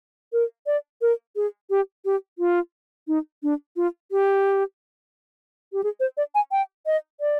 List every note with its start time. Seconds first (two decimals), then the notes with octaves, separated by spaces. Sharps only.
0.33 A#4
0.66 D5
1.02 A#4
1.36 G#4
1.70 G4
2.05 G4
2.39 F4
3.08 D#4
3.43 D4
3.76 F4
4.11 G4
5.73 G4
5.84 G#4
6.00 C5
6.17 D5
6.35 G#5
6.52 G5
6.86 D#5
7.20 D5